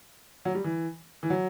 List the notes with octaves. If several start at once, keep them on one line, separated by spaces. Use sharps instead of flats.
F#3
G3
E3
E3
F#3